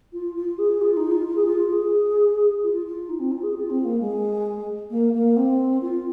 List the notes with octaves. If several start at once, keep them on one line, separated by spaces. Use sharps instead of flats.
F4
F4
G#4
F4
D#4
F4
F4
G#4
F4
G#4
F4
F4
D#4
C4
F4
G#4
F4
C4
A#3
G#3
A#3
A#3
C4
F4